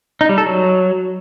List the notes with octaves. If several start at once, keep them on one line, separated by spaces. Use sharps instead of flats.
D#4
G3
A4
F#3